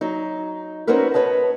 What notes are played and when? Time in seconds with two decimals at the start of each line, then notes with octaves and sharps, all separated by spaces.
0.01 F#3 D#4
0.87 C4 C#4 D#4 F#4 A#4 B4
1.14 B4 C#5 D#5 A5